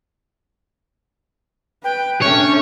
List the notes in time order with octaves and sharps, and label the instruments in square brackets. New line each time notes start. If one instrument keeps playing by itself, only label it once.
[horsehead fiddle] B4 [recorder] G5
[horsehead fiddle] A3 D4 [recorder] C#4 [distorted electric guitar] C#5